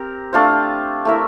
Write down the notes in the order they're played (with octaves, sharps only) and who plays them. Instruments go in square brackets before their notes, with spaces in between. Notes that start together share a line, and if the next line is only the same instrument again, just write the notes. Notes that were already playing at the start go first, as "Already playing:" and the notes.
Already playing: [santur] C4 G4 A#4
A3 D4 F4 C5
A3 E4 A#4 E5